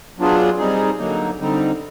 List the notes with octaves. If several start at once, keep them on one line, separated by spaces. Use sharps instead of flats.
F#3 B3 D4 F4 G#4
G3 C4 D#4 G#4
D3 F#3 A#3 D#4
D3 G3 C4 D#4